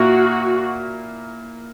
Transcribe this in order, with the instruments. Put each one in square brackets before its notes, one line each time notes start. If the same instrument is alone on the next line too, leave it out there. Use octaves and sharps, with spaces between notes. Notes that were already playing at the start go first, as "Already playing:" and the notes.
Already playing: [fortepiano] A#2 A#3 E4 A#4 [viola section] F#4